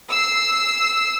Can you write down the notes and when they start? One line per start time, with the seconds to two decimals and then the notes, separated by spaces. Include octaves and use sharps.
0.11 E6 C7